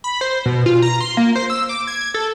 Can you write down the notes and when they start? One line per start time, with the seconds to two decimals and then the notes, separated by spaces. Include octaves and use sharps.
0.04 B5
0.21 C5
0.46 B2
0.66 F4
0.82 A#5
1.01 C6
1.17 A#3
1.35 C5
1.50 E6
1.69 D6
1.87 G#6
2.14 A4